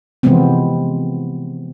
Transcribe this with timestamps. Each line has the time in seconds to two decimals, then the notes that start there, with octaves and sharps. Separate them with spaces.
0.23 C3 E3 F3 G#3 B3 C4